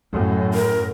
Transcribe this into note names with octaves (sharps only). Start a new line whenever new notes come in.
F#2 A2
A#4